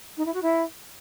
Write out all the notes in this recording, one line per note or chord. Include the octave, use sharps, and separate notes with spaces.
D#4
E4
F#4
E4